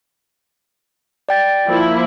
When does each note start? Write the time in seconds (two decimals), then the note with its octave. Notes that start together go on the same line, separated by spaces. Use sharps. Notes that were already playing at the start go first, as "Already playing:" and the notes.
1.29 D5 G5 A6
1.67 F3 A#3 E4